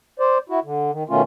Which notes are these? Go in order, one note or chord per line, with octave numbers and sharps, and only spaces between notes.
C5 D5
E4 F#4
D3
D#3
B2 D#3 A3 C#4 F4